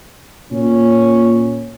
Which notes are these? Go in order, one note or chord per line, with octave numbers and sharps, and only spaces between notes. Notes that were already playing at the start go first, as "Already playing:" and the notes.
A#2 C#4